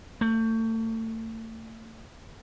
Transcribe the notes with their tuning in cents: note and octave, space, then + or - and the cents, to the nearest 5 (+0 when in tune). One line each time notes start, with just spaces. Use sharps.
A3 +35